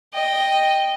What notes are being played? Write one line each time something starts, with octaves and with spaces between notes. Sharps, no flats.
D#5 G5